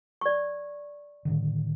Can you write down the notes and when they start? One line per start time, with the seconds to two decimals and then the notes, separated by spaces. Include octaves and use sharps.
0.21 D5 C#6
1.25 A2 D3 D#3